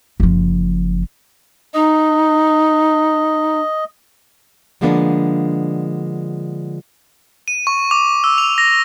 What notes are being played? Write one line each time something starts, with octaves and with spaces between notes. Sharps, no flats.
F#1 F3
D#4 D#5
D3 F3 G#3 A#3 B3 D4
D#7
C#6
D6
E6
F7
A#6